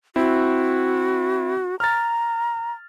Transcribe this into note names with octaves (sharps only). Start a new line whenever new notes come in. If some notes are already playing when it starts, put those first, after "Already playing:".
C4 E4 F#4
A#5 F6 A6